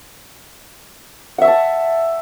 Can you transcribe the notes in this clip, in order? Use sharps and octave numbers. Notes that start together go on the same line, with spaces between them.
E5 F#5 A5 C#6